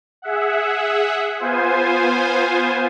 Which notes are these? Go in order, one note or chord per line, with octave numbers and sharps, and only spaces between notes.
G#4 E5 F#5
B3 F4 C5 G#5